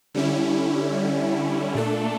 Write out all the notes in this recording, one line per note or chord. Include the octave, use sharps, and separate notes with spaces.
D3 G3 C#4 E4
A#2 A3 D4 A4